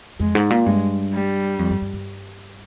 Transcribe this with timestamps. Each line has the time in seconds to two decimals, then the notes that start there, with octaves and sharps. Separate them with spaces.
0.20 F2 G#3
0.35 G#2
0.50 A#2
0.65 G2 G#3
1.13 G3
1.59 F2
1.71 G2
1.82 G2
1.93 G2